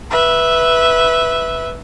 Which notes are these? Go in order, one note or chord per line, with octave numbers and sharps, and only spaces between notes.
B4 E5